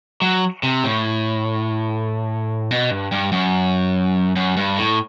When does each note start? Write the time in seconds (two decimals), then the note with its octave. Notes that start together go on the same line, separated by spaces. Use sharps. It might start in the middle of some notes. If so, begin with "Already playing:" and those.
0.22 F#3
0.63 C3
0.84 A2
2.71 B2
2.91 G2
3.12 G2
3.32 F#2
4.36 F#2
4.57 G2
4.77 A2